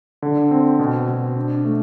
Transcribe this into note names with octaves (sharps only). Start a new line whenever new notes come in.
D3
C4
B2
B2
D4
A3